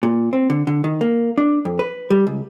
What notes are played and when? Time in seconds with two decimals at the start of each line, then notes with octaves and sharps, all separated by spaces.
0.03 A#2
0.33 C4
0.50 D3
0.67 D3
0.84 D#3
1.01 A#3
1.38 D4
1.65 F2
1.79 B4
2.10 G3
2.27 C#2